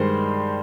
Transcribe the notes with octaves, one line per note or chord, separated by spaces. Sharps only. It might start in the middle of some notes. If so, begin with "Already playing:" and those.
Already playing: G2 D#3 G#3 C5